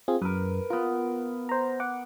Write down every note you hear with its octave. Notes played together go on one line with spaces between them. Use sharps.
C4 F4 G#4
F#2 A#4 B4
B3 F4 A#4
C5 A#5
F#5 D6